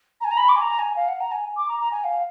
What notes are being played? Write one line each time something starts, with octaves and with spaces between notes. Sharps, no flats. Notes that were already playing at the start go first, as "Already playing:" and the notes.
A#5
G#5
A#5
B5
D6
G#5
A#5
G#5
F5
F#5
A#5
G#5
D6
A#5
A#5
G#5
F5